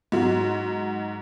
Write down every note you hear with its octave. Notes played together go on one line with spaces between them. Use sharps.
G#2 F#3